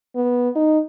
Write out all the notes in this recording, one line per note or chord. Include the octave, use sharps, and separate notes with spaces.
B3
D#4